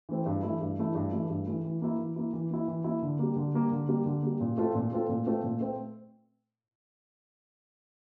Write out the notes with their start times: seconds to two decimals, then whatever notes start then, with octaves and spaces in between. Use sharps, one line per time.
0.09 E3 A3 C4
0.26 G2
0.43 E3 A3 E4
0.61 G2
0.79 E3 A3 E4
0.95 G2
1.13 E3 A3 E4
1.30 G2
1.47 E3 A3 E4
1.65 E3
1.82 A#3 E4
1.99 E3
2.16 A#3 E4
2.33 E3
2.50 A#3 E4
2.68 E3
2.84 A#3 E4
3.02 D3
3.19 G3 A#3
3.36 D3
3.54 G3 A#3
3.71 D3
3.89 G3 A#3
4.06 D3
4.23 G3 A#3
4.41 A#2
4.57 A3 C4 F4 A4
4.75 A#2
4.92 A3 C4 F4 A4
5.09 A#2
5.26 A3 C4 F4 A4
5.44 A#2
5.60 A3 C4